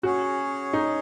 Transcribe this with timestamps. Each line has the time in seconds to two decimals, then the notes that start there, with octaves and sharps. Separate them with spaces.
0.03 C#4 F#4 G#4 C#5
0.73 D#4